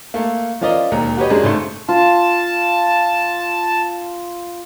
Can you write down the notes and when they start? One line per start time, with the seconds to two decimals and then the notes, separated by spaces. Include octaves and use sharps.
0.14 A3 A#3
0.61 F3 C#4 F4 A#4 D5 D#5
0.91 E1 D#2 A#5
1.17 F#4 G4 B4 C#5 D#5
1.30 F#2 G#3 D4 G#4
1.43 G#2 C#3 A3 C6
1.89 F4 A5